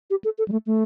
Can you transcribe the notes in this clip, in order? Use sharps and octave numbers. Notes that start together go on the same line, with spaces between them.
G4
A4
A4
G3
A3
A3